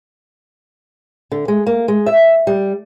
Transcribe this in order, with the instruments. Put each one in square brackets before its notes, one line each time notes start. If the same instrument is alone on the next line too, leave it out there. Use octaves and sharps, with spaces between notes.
[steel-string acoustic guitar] D3
G#3
A#3
G#3
E5
G3